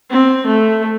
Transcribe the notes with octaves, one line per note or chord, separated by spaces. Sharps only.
C4
A3